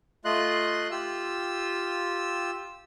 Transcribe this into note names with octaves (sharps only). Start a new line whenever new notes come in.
A3 F4 D#5 C6 F#6
F4 G4 E6